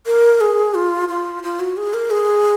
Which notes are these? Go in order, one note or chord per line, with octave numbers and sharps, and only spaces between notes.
A#4
G#4
F4
F4
F4
F#4
G#4
A#4
G#4